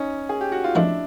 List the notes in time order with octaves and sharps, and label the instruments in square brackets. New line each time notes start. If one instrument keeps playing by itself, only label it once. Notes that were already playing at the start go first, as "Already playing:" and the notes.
Already playing: [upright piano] C#4 D#4
G#4
G4
F#4
F4
[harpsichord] A2 F3 G#3 C4 [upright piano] D4 E4